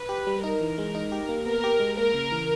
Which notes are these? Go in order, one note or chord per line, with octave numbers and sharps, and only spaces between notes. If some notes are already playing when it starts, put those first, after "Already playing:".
Already playing: B4
G4
G3
D#4 A#4
E3
G#3
D#4
G4
A#3
B3 A#4
G4
G#3
A#3 A#4
C#3
E3